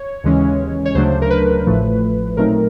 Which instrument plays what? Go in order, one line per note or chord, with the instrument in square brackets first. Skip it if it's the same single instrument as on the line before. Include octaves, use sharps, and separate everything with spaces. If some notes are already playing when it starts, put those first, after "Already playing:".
Already playing: [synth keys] C#5
D#2 C#3 E3 G#3 C#4
C#5
D2 C#3 F#3 A3 D4 C5
A#4
B4
A1 A2 F3 A3
A#2 F#3 A3 C4 D#4 A#4